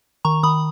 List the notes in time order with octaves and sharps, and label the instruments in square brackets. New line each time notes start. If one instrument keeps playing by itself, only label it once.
[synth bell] D#3 A#5 C#6
D#3 B5 D#6